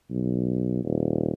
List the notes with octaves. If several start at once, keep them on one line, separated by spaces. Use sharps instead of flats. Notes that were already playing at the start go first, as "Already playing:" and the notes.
B1
D#1